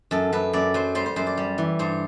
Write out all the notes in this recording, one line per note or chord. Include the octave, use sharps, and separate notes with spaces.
F#2 A4
F#2 B4
F#2 D5
F#3 C5
G3 C5
C5
F#2 C5
D5
G3
E3
G2 C5